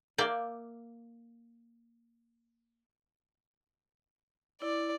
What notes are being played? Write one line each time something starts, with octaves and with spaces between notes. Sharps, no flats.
A#3 D5 E5 G5
E4 D5